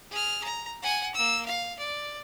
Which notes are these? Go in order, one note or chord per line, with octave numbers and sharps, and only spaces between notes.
G#4 F6
A#5
F#5 G#5
A#3 E6
F5
D5